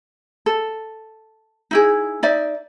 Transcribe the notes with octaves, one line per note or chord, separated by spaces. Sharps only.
A4
D#4 E4 G#4
D#4 D5 E5